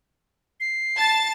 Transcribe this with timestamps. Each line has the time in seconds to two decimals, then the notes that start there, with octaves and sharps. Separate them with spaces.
0.60 C7
0.98 A5 A6